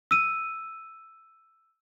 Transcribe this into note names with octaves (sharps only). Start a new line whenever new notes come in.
E6 D#7